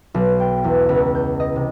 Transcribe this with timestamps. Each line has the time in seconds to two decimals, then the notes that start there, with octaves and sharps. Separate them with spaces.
0.14 B1
0.40 G5
0.64 E2
0.89 C#2
1.15 G6
1.40 D#5
1.56 C3